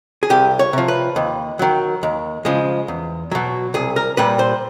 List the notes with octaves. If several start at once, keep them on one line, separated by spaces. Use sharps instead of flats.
G#4
C2 G4
C#5
C3 F3
B4
D#2
D#3 F#3
D#2
C#3 F3 G#3
E2
B2 F#3
C2 G#4
A#4
A#2 G3 B4
C5